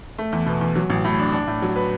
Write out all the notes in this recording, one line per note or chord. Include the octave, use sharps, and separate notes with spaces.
A3
E2
B2
E2
F#3
A1
A2
D4
D4
A2
F#3
B4